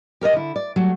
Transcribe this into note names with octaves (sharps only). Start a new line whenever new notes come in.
G4 A#4 C#5 D#5
D3 E4
D5
F#3 G3 A3